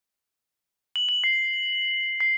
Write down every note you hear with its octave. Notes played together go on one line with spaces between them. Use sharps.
F#7
F#7
C7
C7